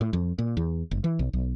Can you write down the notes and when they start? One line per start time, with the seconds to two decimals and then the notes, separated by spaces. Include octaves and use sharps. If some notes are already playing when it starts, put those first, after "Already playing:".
0.01 A2
0.13 F2
0.39 A#2
0.57 E2
0.91 F#1
1.04 E3
1.19 B1
1.33 B1